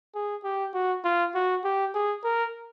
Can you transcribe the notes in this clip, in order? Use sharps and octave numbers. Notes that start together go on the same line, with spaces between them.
G#4
G4
F#4
F4
F#4
G4
G#4
A#4